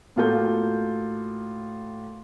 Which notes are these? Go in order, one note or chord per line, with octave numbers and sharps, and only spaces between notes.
A2 A#3 F4 F#4 A4 G6